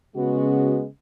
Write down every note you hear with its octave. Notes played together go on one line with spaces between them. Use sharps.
C#3 G#3 B3 F#4